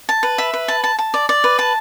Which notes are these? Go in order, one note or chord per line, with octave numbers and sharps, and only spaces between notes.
A5
B4
E5
B4
A5
A5
A5
D5
D5
B4
A5